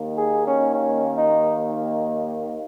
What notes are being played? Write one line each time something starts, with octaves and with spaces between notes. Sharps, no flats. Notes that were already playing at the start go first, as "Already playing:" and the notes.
Already playing: D#2 D#3 A#3
G#4
C#4
C#4
D#4